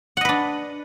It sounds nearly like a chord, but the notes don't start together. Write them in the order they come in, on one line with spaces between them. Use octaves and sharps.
F#5 D#5 B4 D4